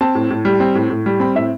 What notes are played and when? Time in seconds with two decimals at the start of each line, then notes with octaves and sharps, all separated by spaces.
0.01 C4 A5
0.15 A2
0.30 A2
0.45 G3
0.60 C4
0.75 A2
0.90 A2
1.06 G3
1.20 C4 B5
1.35 A2 E5